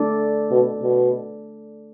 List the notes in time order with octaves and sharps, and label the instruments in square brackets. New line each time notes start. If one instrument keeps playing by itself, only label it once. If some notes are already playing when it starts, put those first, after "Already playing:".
Already playing: [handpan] A3 D4 A4 D5
[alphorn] B2
B2